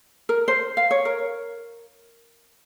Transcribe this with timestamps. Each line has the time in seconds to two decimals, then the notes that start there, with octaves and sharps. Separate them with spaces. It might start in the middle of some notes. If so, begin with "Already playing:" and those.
0.29 A#4
0.48 C5
0.77 F5
0.91 C#5
1.05 A#4